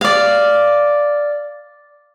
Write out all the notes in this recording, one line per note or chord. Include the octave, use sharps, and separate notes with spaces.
D5 F5